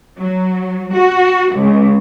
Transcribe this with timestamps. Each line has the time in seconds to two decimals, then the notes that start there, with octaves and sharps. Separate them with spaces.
0.18 F#3
0.94 F#4
1.55 C#2